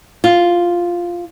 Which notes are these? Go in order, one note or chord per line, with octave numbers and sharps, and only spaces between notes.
F4